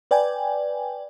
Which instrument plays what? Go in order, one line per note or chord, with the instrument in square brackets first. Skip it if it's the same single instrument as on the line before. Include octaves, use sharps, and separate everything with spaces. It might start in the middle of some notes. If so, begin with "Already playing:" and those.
[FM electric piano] B4 D5 G5 G#5